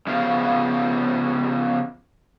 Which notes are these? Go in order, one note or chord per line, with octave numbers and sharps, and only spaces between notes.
C#3 F3 B3 F5